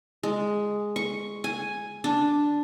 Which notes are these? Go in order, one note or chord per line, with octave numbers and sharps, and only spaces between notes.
G#3
C#6
G#5
D4